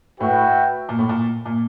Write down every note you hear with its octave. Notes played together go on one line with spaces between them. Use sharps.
A2 F#4 B4 E5 G5
A#2
A2
A#2
A#2